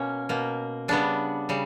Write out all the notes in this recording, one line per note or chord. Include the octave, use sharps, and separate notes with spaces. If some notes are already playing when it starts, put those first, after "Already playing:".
Already playing: B2 A#3 C#4
B2 A#3
C#3 G3 B3 D4
C#3 G3